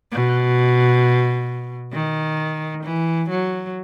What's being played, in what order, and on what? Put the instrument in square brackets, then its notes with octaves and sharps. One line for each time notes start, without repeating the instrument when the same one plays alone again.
[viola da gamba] B2
D#3
E3
F#3